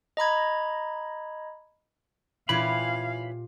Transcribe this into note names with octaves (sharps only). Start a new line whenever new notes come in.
D#5 A#5 B5 G#6
A#2 E3 C#4 E4 F4 G4 F5 B5